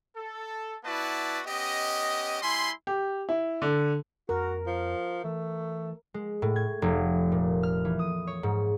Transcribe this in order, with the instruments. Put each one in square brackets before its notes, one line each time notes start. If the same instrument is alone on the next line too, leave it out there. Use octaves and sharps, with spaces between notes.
[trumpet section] A4
B3 E4 F#4 B4 D5 A5
B3 C#4 G4 D#5
G3 E4 G#5 B5 C6
[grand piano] G4
E4
D3
[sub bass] F2 [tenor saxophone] F#4 [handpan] A#4
[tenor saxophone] F3
[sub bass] E3 [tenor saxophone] A3
[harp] G#3
A2
G#6
F1
A#2
F6
E3
D#6
C#5
G#2